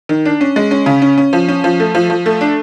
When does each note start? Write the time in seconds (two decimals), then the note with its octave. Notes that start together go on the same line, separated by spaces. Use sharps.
0.09 D#3
0.26 D4
0.41 C#4
0.56 G#3
0.71 C#4
0.86 C#3
1.02 C#4
1.18 C#4
1.33 F3
1.48 C#4
1.64 F3
1.80 A3
1.95 F3
2.10 F3
2.26 A3
2.41 D4